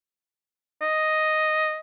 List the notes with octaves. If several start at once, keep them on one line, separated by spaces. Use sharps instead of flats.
D#5